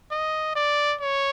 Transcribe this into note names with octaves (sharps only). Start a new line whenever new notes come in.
D#5
D5
C#5